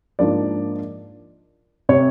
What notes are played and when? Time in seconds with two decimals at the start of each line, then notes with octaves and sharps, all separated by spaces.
0.19 G#2 F3 A#3 D4 D5
1.89 C3 C#5